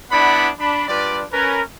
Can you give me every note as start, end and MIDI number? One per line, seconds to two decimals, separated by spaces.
0.11 0.48 59
0.11 0.48 62
0.11 0.48 64
0.11 0.48 74
0.11 0.48 78
0.11 0.48 83
0.58 0.84 62
0.58 0.84 83
0.87 1.22 55
0.87 1.22 62
0.87 1.22 65
0.87 1.22 71
0.87 1.22 74
1.33 1.61 61
1.33 1.61 70
1.33 1.61 71